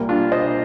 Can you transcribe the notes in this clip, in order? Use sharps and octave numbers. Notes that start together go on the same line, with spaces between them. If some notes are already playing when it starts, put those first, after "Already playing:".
Already playing: C2 A#2 G3 A#3
D4 F4
C5 D#5